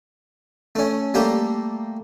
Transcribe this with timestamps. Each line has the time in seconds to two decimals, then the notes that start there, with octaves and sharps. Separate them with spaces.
0.75 A3 C#4
1.14 G3 A3 A#3 G4